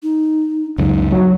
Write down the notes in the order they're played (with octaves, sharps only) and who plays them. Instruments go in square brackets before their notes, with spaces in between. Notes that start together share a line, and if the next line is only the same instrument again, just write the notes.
[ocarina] D#4
[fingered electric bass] C#2 F#2 [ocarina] D#4
[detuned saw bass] F#3